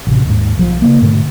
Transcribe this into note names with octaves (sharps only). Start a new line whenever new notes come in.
A1 C3
D#2 G#2
B1 F3
C#3 A#3
G#2 B2 D3 A3